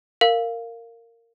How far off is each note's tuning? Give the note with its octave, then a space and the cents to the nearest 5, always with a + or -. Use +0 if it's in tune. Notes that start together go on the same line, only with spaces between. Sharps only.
A#4 -15 F5 +0